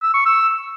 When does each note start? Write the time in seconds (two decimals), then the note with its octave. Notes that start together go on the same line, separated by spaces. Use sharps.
0.03 E6
0.14 C#6
0.26 E6